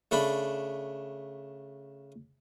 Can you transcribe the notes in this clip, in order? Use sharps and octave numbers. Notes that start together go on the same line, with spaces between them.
C#3 A3 D4 B5